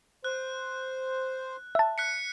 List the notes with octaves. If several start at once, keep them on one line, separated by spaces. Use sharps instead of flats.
C5 F#6
E5 A5
F#6 B6 C#7